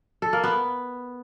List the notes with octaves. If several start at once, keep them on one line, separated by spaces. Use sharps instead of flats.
A4
A#3
B3